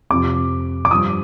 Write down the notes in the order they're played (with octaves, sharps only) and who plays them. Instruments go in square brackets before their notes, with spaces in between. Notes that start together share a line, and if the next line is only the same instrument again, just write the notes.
[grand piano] F2 C3 F3 D6
D6
G2 F3 D#6